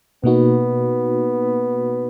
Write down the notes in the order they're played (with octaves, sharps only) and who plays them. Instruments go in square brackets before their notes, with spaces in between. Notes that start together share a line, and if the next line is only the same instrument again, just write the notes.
[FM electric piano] B2 A#3 D#4 F#4 [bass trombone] B3